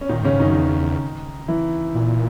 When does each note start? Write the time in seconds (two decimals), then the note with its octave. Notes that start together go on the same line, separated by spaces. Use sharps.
0.01 C#4
0.09 A#2 D#3 D#4
0.21 G#2
0.25 C#3 C#4
0.33 G#2
0.40 F#2 D#3 D#4
0.55 E2
1.48 E3 E4
1.95 A#2